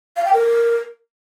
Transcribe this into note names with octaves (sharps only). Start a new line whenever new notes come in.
F5
G5
A#4